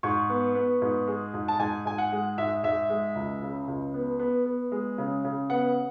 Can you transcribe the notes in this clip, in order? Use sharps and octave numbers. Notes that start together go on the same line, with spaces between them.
G#2 C#6
B3
B3
G#2
G#3
G#2
A5
G#2 G#5
G#2 G#5
F#5
G#3
G#2 E5
G#2 E5
G#3
C#2
C#3
C#2
B3
B3
B3
G#3
C#3
C#3
B3 F#5